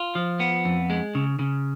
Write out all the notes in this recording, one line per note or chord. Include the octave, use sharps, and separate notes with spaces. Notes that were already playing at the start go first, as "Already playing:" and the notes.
Already playing: F4
F3
B3
F2
G#3
C#3
C#3